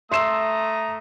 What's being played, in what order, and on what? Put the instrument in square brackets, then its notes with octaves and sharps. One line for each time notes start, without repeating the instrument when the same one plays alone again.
[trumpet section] A3 A#5 D#6 [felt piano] E5 C7 E7 [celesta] C6 E6